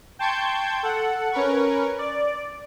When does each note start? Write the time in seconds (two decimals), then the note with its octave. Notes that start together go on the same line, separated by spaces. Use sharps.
0.19 G5 A5 C6 C#6 G6 G#6
0.83 A4 F#5
1.32 C#4 A#4 B4 C#6
1.99 D5